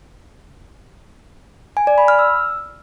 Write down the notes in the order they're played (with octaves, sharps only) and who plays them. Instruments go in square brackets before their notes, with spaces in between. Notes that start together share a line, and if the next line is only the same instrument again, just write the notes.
[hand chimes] G#5
D5
B5
F6
E6